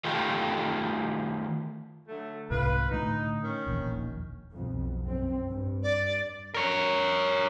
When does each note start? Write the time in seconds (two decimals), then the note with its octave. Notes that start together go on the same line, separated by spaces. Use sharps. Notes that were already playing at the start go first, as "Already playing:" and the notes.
0.04 D#3 A3 F4 G4
2.08 D3 F#3 A3
2.51 C2 G#2 C3 F4 B4
2.91 A2 D3 A3 D#4
3.43 D#3 C#4
3.67 E1 A#1 D#2
4.52 B1 F2
5.03 F#2 C4
5.48 G2
5.82 D5
6.54 A#4 C#5